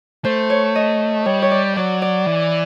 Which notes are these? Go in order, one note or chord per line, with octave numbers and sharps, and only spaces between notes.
A3 C5
C#5
D#5
G3 C#5
C#5
D5
F#3 D5
D5
E3